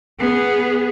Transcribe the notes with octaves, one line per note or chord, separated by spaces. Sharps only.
B3 G#4